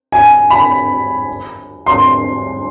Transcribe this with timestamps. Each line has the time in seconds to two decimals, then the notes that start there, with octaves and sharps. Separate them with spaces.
0.12 G#5
0.50 B5
1.86 C6